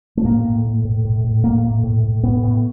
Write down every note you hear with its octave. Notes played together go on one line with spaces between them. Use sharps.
A3
A2 A#3
A2
A2
A2
A2
A2
A2 A#3
A2
A2
A2
A2 B3
A2